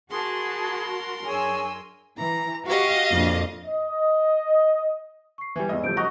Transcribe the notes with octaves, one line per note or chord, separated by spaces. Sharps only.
F#4 G#4 A#4 A5 B5 C6
F#2 D4 G#4 C#5 G#5 E6
E3 A#5
F#4 G4 D#5 F5
F2 A#2 D4
D#5
C#6 C7
E3 G3 G#5
E2 G#2 E3 D#5
C#3 F3 G3 A3 G6 D7
F#4 D#5 A#5 C#6